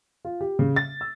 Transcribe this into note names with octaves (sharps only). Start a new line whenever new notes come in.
F4
G4
C#3
A6
E6